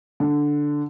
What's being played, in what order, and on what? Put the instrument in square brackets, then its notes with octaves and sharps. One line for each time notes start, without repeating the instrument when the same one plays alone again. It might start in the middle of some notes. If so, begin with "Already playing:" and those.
[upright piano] D3